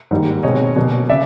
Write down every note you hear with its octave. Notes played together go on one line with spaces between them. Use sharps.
G#2 D#3 G3 A#3
B2 G#3 C4 C#5 D#5
B2 F#3 A#3 D4
C#3 D5 E5